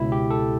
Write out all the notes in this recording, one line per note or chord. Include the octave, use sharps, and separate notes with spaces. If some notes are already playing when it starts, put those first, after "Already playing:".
Already playing: C#2 B2 E4
G4
A4